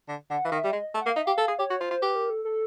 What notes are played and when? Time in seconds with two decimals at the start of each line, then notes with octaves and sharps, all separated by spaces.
0.08 D3
0.30 D3 F#5
0.45 E3 F5
0.52 D#3
0.58 E5
0.64 G3
0.72 G#3 D#5
0.94 A3
1.01 F#5
1.06 A#3
1.10 F5
1.16 D#4 E5
1.26 G4 F5
1.38 A4
1.48 G#4
1.59 G4 C#5
1.70 F#4
1.81 F4 C5
1.91 F4
2.02 G4 B4
2.16 A#4
2.30 A4
2.45 A4